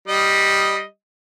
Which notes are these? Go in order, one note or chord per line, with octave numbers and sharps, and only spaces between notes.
G3 D#5